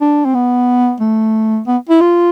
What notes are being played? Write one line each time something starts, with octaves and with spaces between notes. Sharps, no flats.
D4
C4
B3
A3
B3
E4
F4